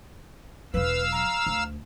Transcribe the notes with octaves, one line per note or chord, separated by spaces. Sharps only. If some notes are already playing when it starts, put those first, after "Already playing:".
E1 F#3 B4 F5 E6
A#5
D2